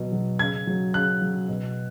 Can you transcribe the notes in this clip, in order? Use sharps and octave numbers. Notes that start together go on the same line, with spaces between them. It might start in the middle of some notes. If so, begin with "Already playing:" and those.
Already playing: B2 F#3
F#3
C#3 G#6
F#3
C#3 F#6
F#3
B2